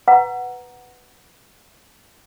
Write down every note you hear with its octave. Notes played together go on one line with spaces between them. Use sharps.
B4 F#5 A#5